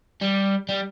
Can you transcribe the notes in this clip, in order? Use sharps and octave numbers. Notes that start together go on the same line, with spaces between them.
G3
G3